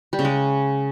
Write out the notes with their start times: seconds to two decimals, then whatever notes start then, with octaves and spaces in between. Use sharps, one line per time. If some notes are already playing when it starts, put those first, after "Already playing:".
0.13 G3
0.19 C#3
0.25 G#3